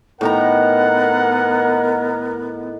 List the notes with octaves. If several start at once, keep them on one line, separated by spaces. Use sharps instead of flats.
A2 D#3 B3 A#4 F#5 A#5